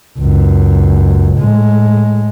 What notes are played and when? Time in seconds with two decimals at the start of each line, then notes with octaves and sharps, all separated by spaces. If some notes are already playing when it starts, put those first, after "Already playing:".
0.19 C#2 F#2
1.38 A2 G#3